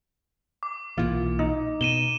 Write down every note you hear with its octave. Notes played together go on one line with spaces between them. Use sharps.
D6
B1 A#2 E3 F4
D#4
B2 D#7 E7 G7